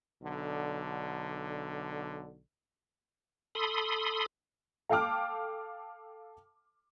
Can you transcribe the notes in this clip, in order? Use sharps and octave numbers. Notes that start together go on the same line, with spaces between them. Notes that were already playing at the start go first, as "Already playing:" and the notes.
B1 D3
A4 B5 C6 D#6
A4 F5 G5 A5 D6 F6